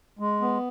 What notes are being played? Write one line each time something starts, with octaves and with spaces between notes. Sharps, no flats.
G#3
B3